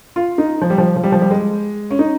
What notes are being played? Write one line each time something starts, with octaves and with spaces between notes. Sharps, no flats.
F4
D#4
F3
G3
F3
F3
G3
F3
G3
G#3
C#4
D#4